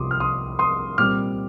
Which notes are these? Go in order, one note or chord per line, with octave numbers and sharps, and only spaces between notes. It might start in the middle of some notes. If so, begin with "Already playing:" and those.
Already playing: C2 C3 F3 C6 D6 D#6
F6
C6 D#6
C6 D#6
A#2 G3 C4 D6 F6